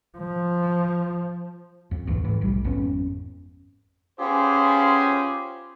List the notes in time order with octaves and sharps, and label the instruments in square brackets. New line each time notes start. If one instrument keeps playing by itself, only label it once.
[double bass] F3
[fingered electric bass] F2
A1 D2 G#2 E3
G#2 E3
F1 B1 G3
G#1 F2 B3 C#4
[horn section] B3 C#4 F4 G4 G#4 C5